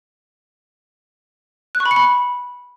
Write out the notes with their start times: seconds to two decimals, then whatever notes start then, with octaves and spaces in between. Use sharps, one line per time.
1.75 F#6
1.80 C#6
1.86 B5
1.91 C#7
1.96 B5